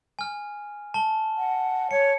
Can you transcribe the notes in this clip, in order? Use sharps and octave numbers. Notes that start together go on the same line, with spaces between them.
G#5 F6
A5 G7
F#5
C#5 C#7